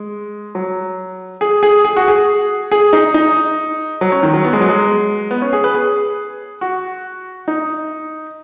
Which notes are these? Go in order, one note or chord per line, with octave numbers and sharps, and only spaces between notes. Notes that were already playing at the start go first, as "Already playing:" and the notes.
Already playing: G#3
F#3
G#4
G#4
G#4
F#4
G#4
G#4
D#4
D#4
F#3
C#4
D#3
F#3
B3
G#3
F#3
G#3
B3
C#4
G#4
B4
G#4
F#4
D#4